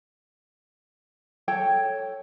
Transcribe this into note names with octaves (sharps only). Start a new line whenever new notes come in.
A4 C#5 G5